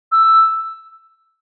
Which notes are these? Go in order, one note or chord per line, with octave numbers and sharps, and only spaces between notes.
E6